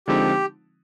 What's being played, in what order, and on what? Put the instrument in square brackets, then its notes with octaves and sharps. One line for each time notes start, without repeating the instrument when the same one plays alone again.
[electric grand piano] D3 F3 G#3 C4 D#4 [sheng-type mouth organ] G4